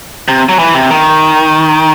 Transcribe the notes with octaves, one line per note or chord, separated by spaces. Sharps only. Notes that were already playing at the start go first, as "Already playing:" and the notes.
C3
F#3
E3
C3
D#3